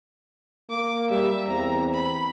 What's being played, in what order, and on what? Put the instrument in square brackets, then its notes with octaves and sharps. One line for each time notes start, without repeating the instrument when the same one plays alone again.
[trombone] A#3 [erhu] D6
[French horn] G3 [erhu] E5
[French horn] E2 [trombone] C4 [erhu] A#5
[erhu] B5